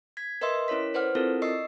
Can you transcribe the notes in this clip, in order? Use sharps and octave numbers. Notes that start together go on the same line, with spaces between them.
G#6 B6
A#4 B4 D#5 E5 C6 E6
C#4 E4 A#4 C#5 B6
B4 C5 D5 F#5 F6
C4 E4 F4 A4 A#4
D5 D#5 C#6 E6 C7